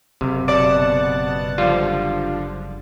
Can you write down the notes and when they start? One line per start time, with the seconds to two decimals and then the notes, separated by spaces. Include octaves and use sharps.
0.21 F#1 C3
0.48 B2 D5 F#5 A5
1.58 D3 F3 G3 F4